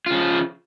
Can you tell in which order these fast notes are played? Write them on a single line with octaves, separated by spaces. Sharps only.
F4 C#3 F3